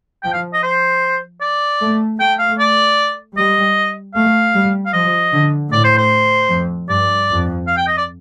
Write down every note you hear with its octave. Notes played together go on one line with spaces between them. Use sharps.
F3 G5
F5
D#5
C5
D5
A3
A3 G5
F5
D5
G3 D#5
A3 F5
G3
F5
F3 D#5
D3
A2 D5
C5
C5
F2
G2 D5
F2
F5
G5
D#5
D5